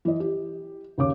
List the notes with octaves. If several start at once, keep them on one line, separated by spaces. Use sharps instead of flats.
E3 D#5
G4
D#2 C#3 D6